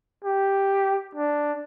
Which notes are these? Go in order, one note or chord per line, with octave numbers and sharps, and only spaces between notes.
G4
D4